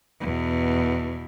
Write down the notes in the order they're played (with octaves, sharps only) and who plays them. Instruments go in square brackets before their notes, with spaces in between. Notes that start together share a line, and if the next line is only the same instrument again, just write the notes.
[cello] E2 B2